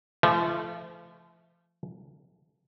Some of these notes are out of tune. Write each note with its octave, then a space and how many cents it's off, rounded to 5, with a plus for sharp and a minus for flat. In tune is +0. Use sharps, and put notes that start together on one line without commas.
F3 -35 A3 -15